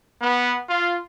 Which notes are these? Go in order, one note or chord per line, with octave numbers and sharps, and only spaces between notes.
B3
F4